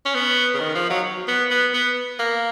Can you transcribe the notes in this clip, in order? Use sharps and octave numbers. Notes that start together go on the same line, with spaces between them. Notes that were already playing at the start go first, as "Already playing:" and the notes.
C#4
B3
C#3
D#3
F3
F#3
B3
B3
B3
A#3